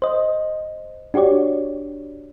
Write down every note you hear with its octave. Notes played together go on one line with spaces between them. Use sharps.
C5 D#5
D4 F#4 G4 C#5 D5